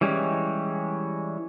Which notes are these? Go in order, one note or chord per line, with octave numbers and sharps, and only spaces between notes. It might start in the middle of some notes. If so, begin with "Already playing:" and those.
E3 G3 G#3 C#4